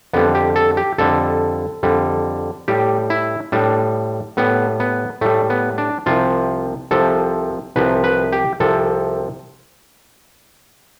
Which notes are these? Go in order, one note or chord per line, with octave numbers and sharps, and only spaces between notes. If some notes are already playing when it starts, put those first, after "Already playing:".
F2 D3 G3 B3
G4
A4
G4
F2 D3 G3 A4
F2 D3 G3
A2 G3 G4
E4
A2 G3 D4
A2 G3 B3
B3
A2 G3 A3
B3
D4
C2 C3 F3 F4
C2 C3 F3 A4
C2 C3 F3 B4
B4
G4
C2 C3 F3 A4